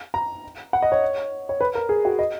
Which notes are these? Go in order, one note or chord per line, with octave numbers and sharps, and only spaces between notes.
A#5
F#5
D#5
C#5
C#5
B4
A#4
G#4
F#4
D#5